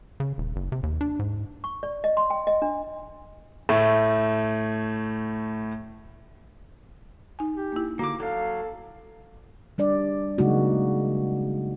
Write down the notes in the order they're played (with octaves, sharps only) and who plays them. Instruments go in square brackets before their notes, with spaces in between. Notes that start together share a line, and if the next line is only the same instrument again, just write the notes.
[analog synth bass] C#3
D#1
F#1
C3
D#2
D4
G#2
[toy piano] C#6
D5
D#5
C6
G5
D#5
D4
[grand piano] A2 A3
[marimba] D#4 G#5
[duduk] G4
[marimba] A#3 E4
[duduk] D3 [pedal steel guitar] A#3 D6 [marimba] F#4
[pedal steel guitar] F#3 F5 [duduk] A4
[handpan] G3 D4 D5
C#3 F#3 G#3 A#3 D#4 F#4